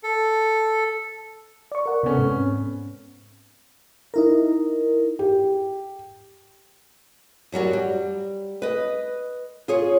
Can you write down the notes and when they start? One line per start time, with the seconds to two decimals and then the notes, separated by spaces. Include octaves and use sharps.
0.03 A4
1.72 D5 C#6
1.86 A#4 F#5
2.03 C3 B3 C#4 A4
2.18 G#2 C4
4.14 D#4 E4 A#4
5.19 G4
7.52 F#2 F#3 G3 F#4
7.73 G3
8.62 B4 D#5
9.68 F4 G#4 C#5